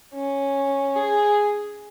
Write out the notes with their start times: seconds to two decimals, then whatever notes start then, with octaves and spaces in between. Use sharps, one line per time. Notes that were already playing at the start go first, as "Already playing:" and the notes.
0.14 C#4
0.96 G#4